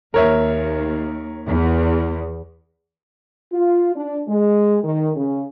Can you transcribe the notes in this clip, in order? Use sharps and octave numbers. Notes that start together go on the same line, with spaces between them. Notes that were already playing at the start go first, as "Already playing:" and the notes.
D#2 A#4 C#5 E5
E2
F4
D4
G#3
D#3
C#3